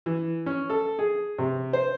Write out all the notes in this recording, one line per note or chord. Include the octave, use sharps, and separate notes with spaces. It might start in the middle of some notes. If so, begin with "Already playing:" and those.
E3
C#4
A4
G#4
C3
C5